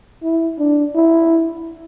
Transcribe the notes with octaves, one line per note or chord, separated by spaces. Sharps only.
E4
D4
E4